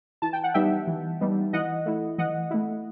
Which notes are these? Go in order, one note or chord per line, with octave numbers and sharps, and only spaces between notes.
E3 A5
G5
F#5
G3 B3 D#4 E5 G5
E3
G3 B3 D#4
E3 D#5 F#5
A3 E4
E3 D#5 F#5
A3 E4